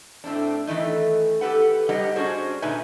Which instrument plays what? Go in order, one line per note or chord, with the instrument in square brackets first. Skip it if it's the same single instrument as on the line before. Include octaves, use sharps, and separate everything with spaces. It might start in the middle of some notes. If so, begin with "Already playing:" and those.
[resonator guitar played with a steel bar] A2 A3 C4 D4
D#3 E3 A3 D#4
G4 A4 B4 F#5
G2 G3 D#4 G4 D#5 F#5
C#4 D4 F#4 G#4 C5
A#2 D3 D#4 B4 E5 G#5